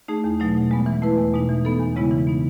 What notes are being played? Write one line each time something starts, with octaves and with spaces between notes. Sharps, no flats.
A3 D#4 G#4
E2
B2 F#3 A3 D#4
B2
G#3 B3
E3
A3 E4 B4
E2
B2 G#3 D#4
E3
B3 D#4 A4
E2
C#3 G#3 B3 E4
E3
B3 D#4